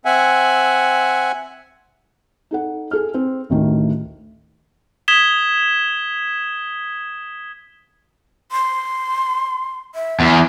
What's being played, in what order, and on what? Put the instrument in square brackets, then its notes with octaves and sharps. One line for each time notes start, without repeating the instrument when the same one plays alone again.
[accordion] C4 E5 F#5 G#5
[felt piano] D#4 A4 F#5
G#4 A4 F6
C4
A1 D2 D#3
[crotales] D#6 G#6 B6 E7 G7
[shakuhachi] C6
E5
[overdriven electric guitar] E2